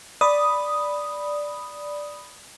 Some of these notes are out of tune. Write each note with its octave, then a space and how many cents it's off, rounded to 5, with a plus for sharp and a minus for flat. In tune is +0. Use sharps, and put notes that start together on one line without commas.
D5 +0 B5 +0 D#6 +0